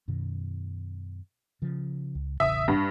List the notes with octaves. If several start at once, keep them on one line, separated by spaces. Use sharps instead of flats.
F#2 B2 D#3
C#3 F3
C#2
E1 A1 C#3 E5 D#6
G2